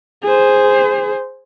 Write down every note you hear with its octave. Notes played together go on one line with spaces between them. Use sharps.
G#4 C5